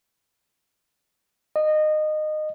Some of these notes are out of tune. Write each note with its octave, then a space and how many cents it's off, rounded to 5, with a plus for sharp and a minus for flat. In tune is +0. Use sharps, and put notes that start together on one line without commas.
D#5 -20